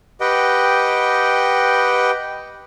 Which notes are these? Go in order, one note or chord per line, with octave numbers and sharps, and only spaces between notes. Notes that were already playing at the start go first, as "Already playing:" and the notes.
G4 B4 D#5 F#5 G5